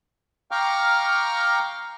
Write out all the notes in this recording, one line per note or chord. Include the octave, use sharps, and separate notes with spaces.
F5 G5 A#5 C#6 D6 F6